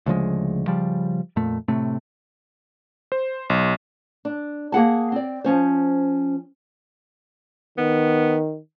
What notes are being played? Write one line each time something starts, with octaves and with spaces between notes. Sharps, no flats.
D2 C#3 F3 G#3
C#3 F3 G3
F2 A#2 A3
A2 C3 A3
C5
B1
D4
A#3 G#4 F#5 A5
C4 D5
F3 C#4 C5
D#3 B3